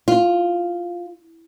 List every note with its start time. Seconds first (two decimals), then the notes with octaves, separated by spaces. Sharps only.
0.08 F4